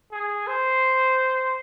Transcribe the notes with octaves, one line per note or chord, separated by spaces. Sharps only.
G#4
C5